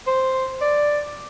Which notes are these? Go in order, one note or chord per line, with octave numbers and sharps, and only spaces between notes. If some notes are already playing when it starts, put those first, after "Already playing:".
C5
D5